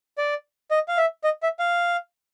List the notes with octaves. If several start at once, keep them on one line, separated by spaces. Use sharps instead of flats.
D5
D#5
F5
E5
D#5
E5
F5